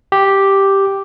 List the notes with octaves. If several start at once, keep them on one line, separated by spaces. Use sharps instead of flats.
G4